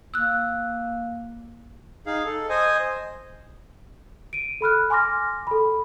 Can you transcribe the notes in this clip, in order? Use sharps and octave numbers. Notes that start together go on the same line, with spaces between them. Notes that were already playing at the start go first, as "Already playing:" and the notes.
A#3 E6 F#6
D#4 G#4 F5
A4
C5 D#5 G#5
D7 D#7
A4 B5 F6 F#6
G#5 C6 D6 F6 A#6
A4 B5